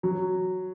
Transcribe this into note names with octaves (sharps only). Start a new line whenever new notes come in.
F#3